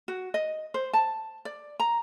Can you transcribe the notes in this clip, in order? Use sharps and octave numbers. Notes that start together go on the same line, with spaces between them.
F#4
D#5
C5
A5
D5
A#5